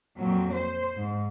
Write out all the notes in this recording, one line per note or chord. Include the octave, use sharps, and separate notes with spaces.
F2 A#2 F#3
C5
G#2